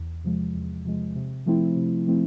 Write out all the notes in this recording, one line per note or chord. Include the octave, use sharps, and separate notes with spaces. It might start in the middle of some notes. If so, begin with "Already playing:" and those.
Already playing: E2
C3 F3 G#3
E2
C3 F3 G#3
C3
F3 A3 C4 E4
C3
F3 A3 C4 E4